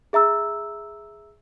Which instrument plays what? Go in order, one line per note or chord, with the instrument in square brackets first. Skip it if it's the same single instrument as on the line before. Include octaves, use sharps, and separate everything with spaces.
[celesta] G#4 E5 A#5 E6